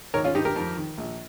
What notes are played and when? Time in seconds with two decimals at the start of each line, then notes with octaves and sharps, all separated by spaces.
0.14 G#1 A#4 C#5
0.24 C#4 F4
0.35 G2 D#4 G4
0.39 D#3
0.45 G4 A#4
0.56 F2
0.77 D#3
0.98 A#1